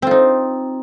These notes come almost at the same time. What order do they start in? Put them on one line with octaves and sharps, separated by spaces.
C4 F4 D#4